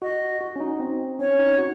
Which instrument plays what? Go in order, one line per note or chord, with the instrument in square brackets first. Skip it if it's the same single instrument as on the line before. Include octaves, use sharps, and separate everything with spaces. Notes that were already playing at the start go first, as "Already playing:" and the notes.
[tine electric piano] F#4 [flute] D#5
[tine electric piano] F#4
C#4
D#4
C4
[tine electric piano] C#4 [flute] C#5
[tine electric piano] D#4
F#4